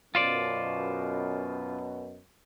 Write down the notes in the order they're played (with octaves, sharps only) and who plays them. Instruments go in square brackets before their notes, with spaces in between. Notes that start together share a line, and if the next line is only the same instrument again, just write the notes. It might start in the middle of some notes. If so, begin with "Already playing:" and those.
[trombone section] F#2 B2 [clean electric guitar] F4 C5 D5